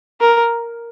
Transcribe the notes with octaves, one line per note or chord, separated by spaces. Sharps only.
A#4